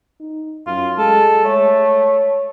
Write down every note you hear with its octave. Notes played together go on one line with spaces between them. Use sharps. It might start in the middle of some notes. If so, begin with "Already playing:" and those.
D#4
F#2 F4
G#3 A4
A3 C#5